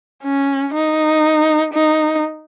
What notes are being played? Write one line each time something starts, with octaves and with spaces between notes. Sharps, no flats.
C#4
D#4
D#4